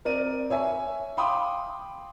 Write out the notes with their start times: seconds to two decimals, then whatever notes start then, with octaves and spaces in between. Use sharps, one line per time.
0.05 C4 A#4 D5 D#7
0.50 C#5 E5 G#5
1.17 F5 G5 B5 C6 D6 D#6